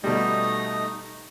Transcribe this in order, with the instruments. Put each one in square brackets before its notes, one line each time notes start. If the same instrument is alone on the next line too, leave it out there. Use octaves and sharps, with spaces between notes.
[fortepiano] B2 G3 [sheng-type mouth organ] A3 D#4 D#5